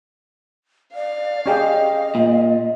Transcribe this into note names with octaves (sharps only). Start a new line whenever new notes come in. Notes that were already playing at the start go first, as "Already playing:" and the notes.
D5 F5
C#4 G4 G#4 D#5
A#2